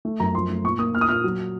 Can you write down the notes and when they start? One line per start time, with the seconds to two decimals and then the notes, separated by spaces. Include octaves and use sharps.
0.05 A3
0.20 F#2 A#5
0.34 F3 C6
0.50 A3
0.64 A#2 C#6
0.79 A#3 D#6
0.93 A#2 F6
1.01 D#6
1.09 A#2 F6
1.24 F#3